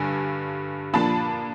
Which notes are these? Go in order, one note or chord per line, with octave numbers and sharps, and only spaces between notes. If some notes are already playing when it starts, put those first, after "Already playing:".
Already playing: G2 D3 G#5
A#2 F3 A#3 D4 A5 B5